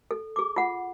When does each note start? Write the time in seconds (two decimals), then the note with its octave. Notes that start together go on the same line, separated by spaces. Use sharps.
0.11 A4
0.36 G#4 D6
0.56 F4 F#5